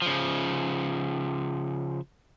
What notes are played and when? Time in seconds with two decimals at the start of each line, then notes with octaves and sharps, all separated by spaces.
0.02 C#3 F3